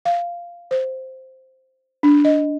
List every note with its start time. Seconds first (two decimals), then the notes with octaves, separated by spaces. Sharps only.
0.05 F5
0.71 C5
2.03 D4
2.25 D#5